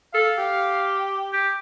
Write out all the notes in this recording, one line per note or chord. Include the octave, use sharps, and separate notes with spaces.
A4 F5
G4
G4